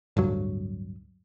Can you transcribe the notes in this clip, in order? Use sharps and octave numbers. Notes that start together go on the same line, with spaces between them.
D1 G2 F#3